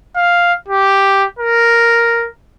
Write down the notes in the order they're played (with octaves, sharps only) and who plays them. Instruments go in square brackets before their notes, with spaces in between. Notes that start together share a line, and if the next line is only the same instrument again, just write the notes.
[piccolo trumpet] F5
G4
A#4